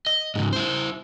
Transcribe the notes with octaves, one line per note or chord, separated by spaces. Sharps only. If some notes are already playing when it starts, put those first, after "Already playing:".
D#5
G#2 C#3
E4 C5